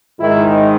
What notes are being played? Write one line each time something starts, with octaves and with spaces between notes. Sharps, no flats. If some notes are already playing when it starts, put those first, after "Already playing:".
G#2 D#3 E4